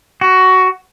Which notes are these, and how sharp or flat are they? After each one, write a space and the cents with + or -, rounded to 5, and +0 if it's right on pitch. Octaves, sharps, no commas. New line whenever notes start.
F#4 +15